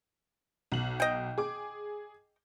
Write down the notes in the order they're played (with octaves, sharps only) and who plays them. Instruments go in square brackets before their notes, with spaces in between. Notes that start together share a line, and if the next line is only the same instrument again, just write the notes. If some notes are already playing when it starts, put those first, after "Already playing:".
[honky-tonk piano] B1 F#7
[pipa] D#5 G5
[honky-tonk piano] G#4 D6